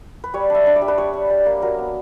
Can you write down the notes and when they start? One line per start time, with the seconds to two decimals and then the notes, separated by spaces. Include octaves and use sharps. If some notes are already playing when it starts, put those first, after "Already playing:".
0.24 B4
0.34 G3 C#5
0.50 D4 E5
0.66 D4
0.76 D5
0.82 G3
0.88 B4
0.98 G3 C#5
1.13 D4
1.30 G3
1.46 A#3
1.62 F#3 A#4
1.79 B3